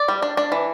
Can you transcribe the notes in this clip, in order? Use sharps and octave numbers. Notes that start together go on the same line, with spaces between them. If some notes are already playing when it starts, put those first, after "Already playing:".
Already playing: D5
G3
D4
D4
E3